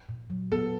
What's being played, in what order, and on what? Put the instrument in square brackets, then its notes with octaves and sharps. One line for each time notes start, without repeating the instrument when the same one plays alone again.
[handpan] A#2
F#3
[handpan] B3 [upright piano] A4